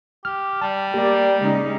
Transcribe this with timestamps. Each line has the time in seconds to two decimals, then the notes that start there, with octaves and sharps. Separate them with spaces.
0.25 G4 F6
0.61 G3 A5
0.94 A#3 G4 D5
1.39 C#3 G#3 D#4